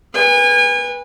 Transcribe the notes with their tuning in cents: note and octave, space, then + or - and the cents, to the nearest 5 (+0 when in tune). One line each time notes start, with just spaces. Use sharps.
B4 -15 G#5 -35